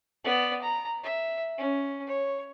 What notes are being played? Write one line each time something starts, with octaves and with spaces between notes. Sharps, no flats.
B3 D5
A#5
E5
C#4
C#5